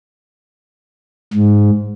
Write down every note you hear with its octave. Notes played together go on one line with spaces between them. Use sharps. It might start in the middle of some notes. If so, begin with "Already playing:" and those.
G#2